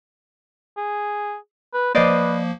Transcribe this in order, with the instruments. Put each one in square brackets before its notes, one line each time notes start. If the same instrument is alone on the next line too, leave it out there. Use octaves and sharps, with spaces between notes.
[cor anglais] G#4
B4
[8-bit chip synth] F3 A#3 [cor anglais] B4 [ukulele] C5 D5 D#5